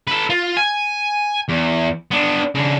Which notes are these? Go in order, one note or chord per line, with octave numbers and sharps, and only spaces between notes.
A4 B4
F4
G#5
E2
B3 D4
C#3 D4